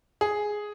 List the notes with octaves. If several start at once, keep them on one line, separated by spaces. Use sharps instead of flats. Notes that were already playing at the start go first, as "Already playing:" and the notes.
G#4